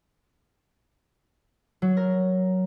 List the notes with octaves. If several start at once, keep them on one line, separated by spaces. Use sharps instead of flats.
F#3
A#4